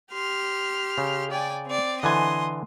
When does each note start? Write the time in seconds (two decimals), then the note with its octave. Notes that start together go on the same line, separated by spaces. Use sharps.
0.13 G4 C6 F6
0.98 C#3
1.30 D5 G5 G#5
1.66 C4 D5
2.03 D3 E3 D#5 G#5 C6